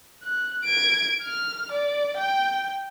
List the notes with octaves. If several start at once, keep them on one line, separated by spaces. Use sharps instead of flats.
F#6
G#6 D7
F6
D5
G5